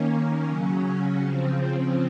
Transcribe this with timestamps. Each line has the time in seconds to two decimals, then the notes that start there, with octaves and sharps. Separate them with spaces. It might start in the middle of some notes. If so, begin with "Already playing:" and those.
Already playing: D#3 A#3 C#4
0.48 C#3 F#3 C#4
1.21 C#3 F3 C4